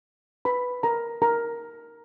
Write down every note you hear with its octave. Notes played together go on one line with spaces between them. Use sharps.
B4 B5
A#4 A#5
A#4 A#5